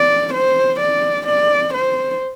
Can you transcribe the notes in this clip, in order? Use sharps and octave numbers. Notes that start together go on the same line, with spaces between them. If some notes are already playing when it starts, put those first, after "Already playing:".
Already playing: D5
C5
D5
D5
C5